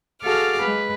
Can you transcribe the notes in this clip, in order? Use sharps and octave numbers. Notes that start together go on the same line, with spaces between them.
F#4 G#4 A4 F5 D6 F6
G#3 B4